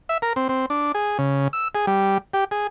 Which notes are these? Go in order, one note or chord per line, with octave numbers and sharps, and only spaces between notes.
E5
A#4
C4
C4
D4
G#4
C#3
E6
G#4
G3
G4
G#4